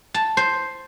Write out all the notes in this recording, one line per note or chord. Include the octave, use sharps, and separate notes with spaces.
A5
C5